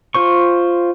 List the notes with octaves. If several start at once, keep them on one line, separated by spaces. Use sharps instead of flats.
F4 C5 C#6